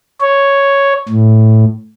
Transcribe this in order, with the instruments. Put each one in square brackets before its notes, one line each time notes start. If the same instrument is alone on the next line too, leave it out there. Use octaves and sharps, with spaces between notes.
[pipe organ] C#5
A2